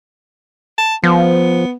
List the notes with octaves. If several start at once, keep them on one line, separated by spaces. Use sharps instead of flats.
A5
F3 B3